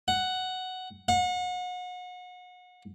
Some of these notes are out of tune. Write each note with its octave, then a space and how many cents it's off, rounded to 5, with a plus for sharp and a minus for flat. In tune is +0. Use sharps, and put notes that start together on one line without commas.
F#5 +5
F#5 -35